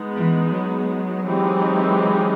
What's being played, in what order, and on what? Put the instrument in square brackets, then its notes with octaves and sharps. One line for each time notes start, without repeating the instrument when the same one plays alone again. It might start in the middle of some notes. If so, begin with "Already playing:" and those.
Already playing: [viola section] G#3 B3 D#4
[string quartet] E3
F#3
[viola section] E3 G#3 C4 D#4 G4